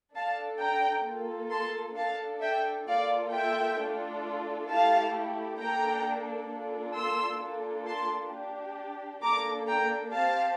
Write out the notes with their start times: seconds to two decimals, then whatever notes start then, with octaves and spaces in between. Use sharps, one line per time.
0.15 D4 A4 F5 A5
0.60 G5 A#5
1.05 A#3 F4 A4
1.51 A5 C6
1.97 D4 A4 F5 A5
2.41 E5 G5
2.87 A#3 F4 A4 D5 F5
3.32 E5 G5
3.78 A3 D4 F4 A4
4.69 A3 E4 G4 F5 A5
5.60 A#3 D4 A4 G5 A#5
6.51 A#3 D4 F4 A4
6.96 C6 E6
7.41 A#3 D4 F4 A4
7.87 A5 C6
8.32 D4 G4
9.23 A#3 D4 A4 A#5 D6
9.67 G5 A#5
10.13 C4 G4 F5 A5